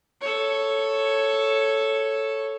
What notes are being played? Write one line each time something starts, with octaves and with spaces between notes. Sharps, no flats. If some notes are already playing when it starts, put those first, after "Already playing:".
A4 C#5